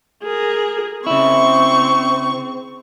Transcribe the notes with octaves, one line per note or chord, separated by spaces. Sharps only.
G#4 A#4
C#3 C4 E4 C#6